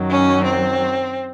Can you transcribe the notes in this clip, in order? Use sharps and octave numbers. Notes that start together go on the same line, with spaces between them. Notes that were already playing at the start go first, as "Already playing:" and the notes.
Already playing: F#2 D#3 F#3
C#4
C4